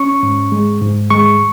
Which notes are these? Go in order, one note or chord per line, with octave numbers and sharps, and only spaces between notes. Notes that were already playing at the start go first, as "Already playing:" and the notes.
Already playing: C#4 C#6
G#2
G#3
G#2
G#3 C#6